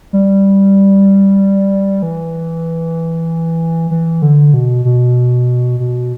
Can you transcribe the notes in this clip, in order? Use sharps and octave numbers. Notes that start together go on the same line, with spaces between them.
G3
E3
E3
D3
B2
B2
B2